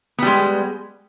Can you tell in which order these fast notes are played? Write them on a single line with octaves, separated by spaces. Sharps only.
B3 G3 G#3